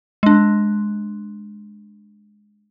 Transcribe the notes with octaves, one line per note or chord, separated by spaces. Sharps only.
G#3 D4